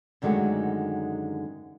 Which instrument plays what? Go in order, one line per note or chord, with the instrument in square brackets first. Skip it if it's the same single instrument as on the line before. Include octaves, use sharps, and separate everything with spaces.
[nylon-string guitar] F#2 D3 D#3 G#3 A3 F#4